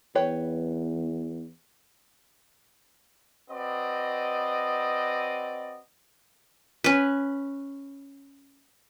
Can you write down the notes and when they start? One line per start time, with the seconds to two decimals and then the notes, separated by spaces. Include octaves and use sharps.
0.15 E2 B4 C#5 G5
3.50 C4 F#4 B4 D5 D#5
6.84 C#4 B4